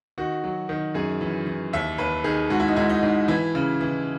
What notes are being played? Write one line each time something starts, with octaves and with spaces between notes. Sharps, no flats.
D#3 F#4
F#3
D#3
F#2 G#4
E3
E3
D#2 E5
D#2 B4
D#3 G#4
G#2 F#4
E4
D#4
G#2 E4
D#4
G#2
E3 E4
C#3
E3